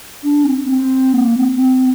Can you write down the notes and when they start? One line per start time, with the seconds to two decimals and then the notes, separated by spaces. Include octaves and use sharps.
0.24 D4
0.47 C4
0.69 C4
1.15 A#3
1.38 C4
1.61 C4